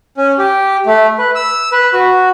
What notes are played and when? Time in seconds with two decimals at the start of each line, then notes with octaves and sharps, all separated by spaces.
0.17 C#4
0.38 G4
0.86 A3
1.19 B4
1.35 E6
1.72 B4
1.93 F#4